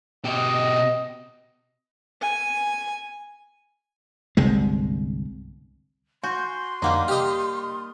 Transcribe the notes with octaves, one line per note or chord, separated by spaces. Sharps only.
B2 G4 D#5
G#5
G1 C2 C3 G#3
F#4 G#5 C6 G6
F2 D3 G3 A#3 D#4 F#5
G4 D#5 D#6 F6